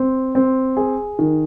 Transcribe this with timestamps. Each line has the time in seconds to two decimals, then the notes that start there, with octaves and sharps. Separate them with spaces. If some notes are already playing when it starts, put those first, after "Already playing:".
Already playing: C4
0.35 C4
0.77 G#4
1.19 D#3